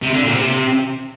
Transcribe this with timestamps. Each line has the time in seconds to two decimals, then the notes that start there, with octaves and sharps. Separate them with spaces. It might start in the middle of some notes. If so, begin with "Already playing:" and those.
0.02 C3
0.13 D3
0.24 A#2
0.35 C3